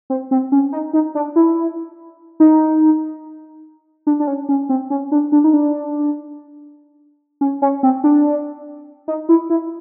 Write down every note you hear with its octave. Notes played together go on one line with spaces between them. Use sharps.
C4
C4
C#4
D#4
D#4
D4
E4
D#4
D4
D4
C#4
C#4
C4
C#4
D4
D4
D#4
D4
C#4
C#4
C4
D4
D#4
E4
E4